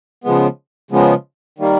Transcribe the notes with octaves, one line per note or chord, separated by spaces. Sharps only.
C#3 F3 G#3 B3
C#3 F3 G#3 B3
D#3 G3 A#3